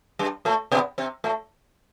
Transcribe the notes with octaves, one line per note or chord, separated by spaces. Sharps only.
G2 G3
A2 A3
B2 B3
C3 C4
A2 A3